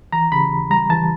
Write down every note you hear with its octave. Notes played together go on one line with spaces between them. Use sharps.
E3 A#5
C#3 B5
D#2
G3 A#5
E3 A5